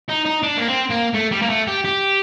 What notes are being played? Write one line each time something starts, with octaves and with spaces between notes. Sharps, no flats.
D#4
D#4
D4
A#3
C4
A#3
A3
G3
A#3
A3
G4
G4